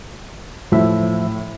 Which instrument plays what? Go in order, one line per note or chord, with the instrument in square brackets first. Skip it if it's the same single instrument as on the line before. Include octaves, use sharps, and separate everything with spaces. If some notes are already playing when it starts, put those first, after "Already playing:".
[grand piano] A2 E4 [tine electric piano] F3 E5